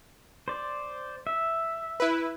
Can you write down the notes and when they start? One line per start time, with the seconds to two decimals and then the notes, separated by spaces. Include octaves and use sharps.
0.48 C5 D5
1.27 E5
2.00 E4 B4